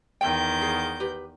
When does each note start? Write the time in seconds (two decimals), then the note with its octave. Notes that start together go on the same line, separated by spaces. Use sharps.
0.21 E2 D#3 G5 G6
0.62 G#4
1.00 G4 B4